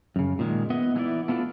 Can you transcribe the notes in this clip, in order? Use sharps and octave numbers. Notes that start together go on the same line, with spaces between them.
F#2 C#3
A#2 D#3 G#3
B3 B4 D#5 E5 F#5
E3 G#3 B3 D#4 E4 D5
A3 B3 D4 F4 A4